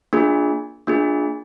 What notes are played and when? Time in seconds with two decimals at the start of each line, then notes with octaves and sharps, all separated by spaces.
0.13 A#3 D4 F4 G#4
0.87 A#3 D4 F4 G#4